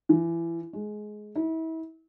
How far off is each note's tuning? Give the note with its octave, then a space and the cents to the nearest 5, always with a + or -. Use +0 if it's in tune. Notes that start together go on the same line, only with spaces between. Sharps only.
E3 +25
G#3 +20
E4 -35